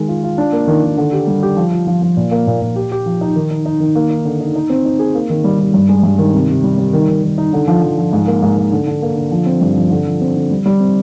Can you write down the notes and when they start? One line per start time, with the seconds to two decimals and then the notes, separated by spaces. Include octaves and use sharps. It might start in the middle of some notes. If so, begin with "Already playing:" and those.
Already playing: D#3 G#3
0.08 F4
0.24 F4
0.38 D4
0.53 A#3
0.67 D#3
0.83 D#3
0.97 D3
1.13 G4
1.27 G3
1.43 G4
1.57 F3
1.72 F4
1.87 F3
2.02 F3
2.17 A#2
2.31 A#3
2.47 A#2
2.62 A#2
2.76 G4
2.92 G4
3.06 F3
3.21 D#4
3.36 D#3
3.51 D#4
3.66 D#4
3.80 D#3
3.95 A#3
4.10 D#4
4.25 D3
4.41 D#4
4.55 D#4
4.70 C4
4.85 D#4
4.99 G#4
5.15 A#3
5.30 D#3
5.44 G3
5.60 G3
5.74 G2
5.89 G#3
6.03 G2
6.18 D#3
6.34 C3
6.49 C3
6.64 G3
6.78 G3
6.93 D#3
7.08 D#3
7.23 D#3
7.38 D#4
7.53 D3
7.68 F3
7.82 F3
7.98 F3
8.13 G#2
8.27 A#3
8.42 G#2
8.57 G#2
8.72 D3
8.87 D3
9.02 A#3
9.17 D3
9.32 F3
9.46 C4
9.61 G2
9.76 F3
9.91 D3
10.06 F3
10.21 C4
10.35 D3
10.51 G3
10.66 G3
10.80 C4